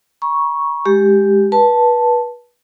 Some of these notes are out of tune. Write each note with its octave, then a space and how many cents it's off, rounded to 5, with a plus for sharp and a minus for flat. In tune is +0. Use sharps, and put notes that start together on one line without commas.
A#5 +45 C#6 +0
G#3 +0 G4 +0
B4 -25 A5 +0